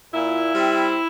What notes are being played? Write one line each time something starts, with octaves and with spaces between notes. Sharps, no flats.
A#2 E4
G3 C4